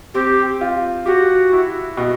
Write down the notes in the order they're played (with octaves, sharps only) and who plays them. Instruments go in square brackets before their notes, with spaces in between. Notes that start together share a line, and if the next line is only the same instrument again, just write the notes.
[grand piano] C4 [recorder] G4
[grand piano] F4
[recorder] F#4 [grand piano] G4
[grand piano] E4
B2